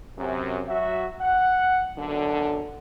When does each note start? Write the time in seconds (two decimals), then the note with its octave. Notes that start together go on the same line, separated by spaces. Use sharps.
0.18 F#2 C3
0.68 F#3 F#4 E5
1.21 F#5
1.98 B1 F#2 D3